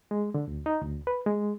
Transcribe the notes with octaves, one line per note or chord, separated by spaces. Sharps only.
G#3
D3
D2
D#4
D2
B4
G#3